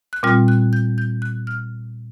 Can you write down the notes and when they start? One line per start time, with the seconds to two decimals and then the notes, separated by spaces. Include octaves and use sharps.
0.13 F#6
0.23 A#2 G3 C4 F4 F6
0.48 F#6
0.73 G6
0.98 G6
1.22 F#6
1.47 F6